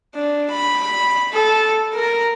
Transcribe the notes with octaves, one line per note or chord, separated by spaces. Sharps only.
D4
B5
A4
A#4